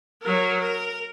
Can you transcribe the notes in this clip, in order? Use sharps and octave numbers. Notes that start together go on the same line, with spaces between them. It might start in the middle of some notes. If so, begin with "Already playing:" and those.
F#3 A#4
A#4